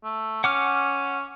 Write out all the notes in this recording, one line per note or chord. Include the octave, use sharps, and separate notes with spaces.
A3
C#4 F#5 D6 F6